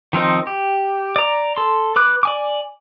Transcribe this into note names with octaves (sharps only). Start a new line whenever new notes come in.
D#3 F3 C4 D#4
G4
D5 A#5
A4 C6
B4 D6 F#6
D5 G#5 D6